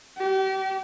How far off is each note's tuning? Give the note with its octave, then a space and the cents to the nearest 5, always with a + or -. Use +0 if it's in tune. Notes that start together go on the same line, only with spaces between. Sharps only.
G4 -35